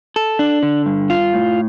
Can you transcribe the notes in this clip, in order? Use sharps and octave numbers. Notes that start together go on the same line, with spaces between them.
A4
D4
D3
G2
F4
A2